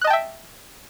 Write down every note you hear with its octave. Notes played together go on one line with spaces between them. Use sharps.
D#5 E5 G5 A5 F#6